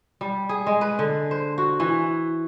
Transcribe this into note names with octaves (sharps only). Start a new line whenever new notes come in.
G3
G#4
G#3
B4
D3
C5
F#4
E3